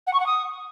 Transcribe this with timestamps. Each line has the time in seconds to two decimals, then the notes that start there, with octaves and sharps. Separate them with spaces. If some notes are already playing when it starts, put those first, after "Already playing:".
0.07 F#5
0.13 C#6
0.20 F#5
0.26 D#6